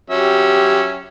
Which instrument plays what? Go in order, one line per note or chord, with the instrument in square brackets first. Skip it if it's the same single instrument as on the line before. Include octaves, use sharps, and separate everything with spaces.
[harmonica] F#3 C#4 E5 [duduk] G4